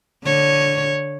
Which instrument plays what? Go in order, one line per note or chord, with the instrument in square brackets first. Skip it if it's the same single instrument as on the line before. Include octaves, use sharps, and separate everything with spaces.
[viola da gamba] D3 C#5